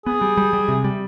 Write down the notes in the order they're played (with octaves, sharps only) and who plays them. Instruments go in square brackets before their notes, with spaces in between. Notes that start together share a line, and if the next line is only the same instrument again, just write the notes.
[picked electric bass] B3 [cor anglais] G#4
[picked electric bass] G3
G3
G3
C3
G3